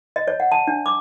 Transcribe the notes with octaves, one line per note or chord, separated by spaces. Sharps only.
D#5
C#5
F#5
A5
D4
D6